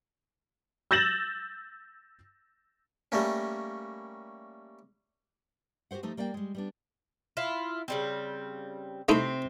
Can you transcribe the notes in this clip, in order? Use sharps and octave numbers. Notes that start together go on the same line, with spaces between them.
E6 G6 A6 A#6 E7 F#7
G3 A3 A#3 C#4
F#4 G4 A#4 C5 F#5
F3 A3 D#4 G4
G3 A#3 D5 F5 G5
G3 G#3
G3 B3 D4
E4 F4
C#3 G3 C4
C3 A3 C4 D#4 E4